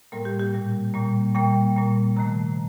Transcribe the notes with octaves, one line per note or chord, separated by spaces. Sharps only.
A2 G3 A#3 A#4
G4
G4
A#2 G3 A#3
A#2 G3 A#3
A#2 G3 A#3 G5
A#2 G3 A#3
C3 D#3 A3 A#5